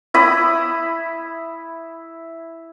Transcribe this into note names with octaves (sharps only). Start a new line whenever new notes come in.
E4 B5 D#6